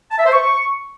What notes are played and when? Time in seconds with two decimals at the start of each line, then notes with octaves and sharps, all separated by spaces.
0.11 A5
0.18 E5
0.25 C5
0.33 C#6